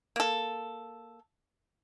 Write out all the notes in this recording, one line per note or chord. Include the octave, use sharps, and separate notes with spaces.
A#3 A4